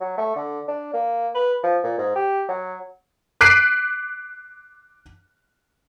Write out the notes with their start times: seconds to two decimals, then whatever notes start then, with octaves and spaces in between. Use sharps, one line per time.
0.01 F#3
0.17 A3
0.36 D3
0.68 D4
0.94 A#3
1.34 B4
1.63 F3
1.83 A#2
1.98 G#2
2.16 G4
2.49 F#3
3.41 D6 F#6 B6 C7 D7 D#7